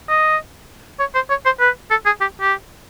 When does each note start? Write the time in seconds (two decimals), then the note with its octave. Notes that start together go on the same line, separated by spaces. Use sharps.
0.10 D#5
1.00 C#5
1.15 C5
1.30 C#5
1.45 C5
1.60 B4
1.91 A4
2.06 G#4
2.21 G4
2.41 G4